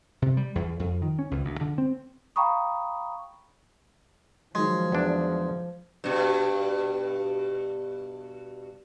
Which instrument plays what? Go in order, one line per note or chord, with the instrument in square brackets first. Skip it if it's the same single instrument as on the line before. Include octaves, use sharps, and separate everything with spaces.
[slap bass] C3
G3
E2
F2
D#3
C#4
C#2
D2
D3
C4
[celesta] F5 G5 A#5 B5 C#6 D#6
[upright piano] D#3 F#3 [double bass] F3 [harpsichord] G#3
[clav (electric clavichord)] E2 D4
[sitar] G2 B2